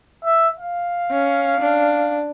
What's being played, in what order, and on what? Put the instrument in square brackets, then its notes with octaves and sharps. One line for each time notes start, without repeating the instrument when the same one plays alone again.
[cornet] E5
F5
[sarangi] C#4
D4